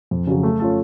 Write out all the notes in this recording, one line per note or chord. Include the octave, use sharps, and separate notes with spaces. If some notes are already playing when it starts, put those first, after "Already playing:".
F2
C#3 F#3
A3
C#4 F4 A4